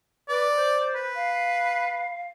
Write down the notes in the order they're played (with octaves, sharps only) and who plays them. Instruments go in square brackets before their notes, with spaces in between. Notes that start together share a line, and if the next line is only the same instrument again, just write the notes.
[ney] B4 [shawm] D5
[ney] C5
[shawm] B4
[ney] F5